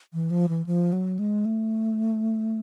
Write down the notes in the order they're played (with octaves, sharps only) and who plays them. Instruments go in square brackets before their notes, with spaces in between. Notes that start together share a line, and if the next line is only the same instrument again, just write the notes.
[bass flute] E3
F3
E3
F3
F#3
G#3
A3